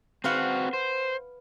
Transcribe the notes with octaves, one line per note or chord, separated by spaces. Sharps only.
C4 F#4 B4 F5 F#5
C5